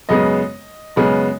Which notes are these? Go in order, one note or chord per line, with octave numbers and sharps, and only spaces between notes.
F#2 C#3 G#3 B3 D#5
F#2 C#3 G#3 B3